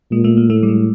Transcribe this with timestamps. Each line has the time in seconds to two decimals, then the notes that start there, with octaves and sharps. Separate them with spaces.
0.11 A#2 G#3
0.24 A3
0.37 A#3
0.49 A2 A3
0.63 G3
0.68 G#3